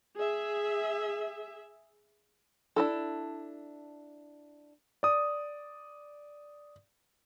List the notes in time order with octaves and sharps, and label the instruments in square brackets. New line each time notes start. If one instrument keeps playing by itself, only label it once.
[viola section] G#4 E5
[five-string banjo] D4 E4 A4
[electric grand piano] D5 D#6